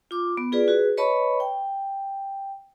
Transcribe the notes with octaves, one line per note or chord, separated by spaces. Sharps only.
F4 D6
B3
F4 G#4 B4 D5
F#4 G#4 B4
B4 C#5 D#5 A5 B5 C#6
G5